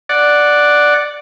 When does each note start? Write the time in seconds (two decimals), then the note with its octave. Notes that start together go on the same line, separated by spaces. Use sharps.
0.09 D5 F#5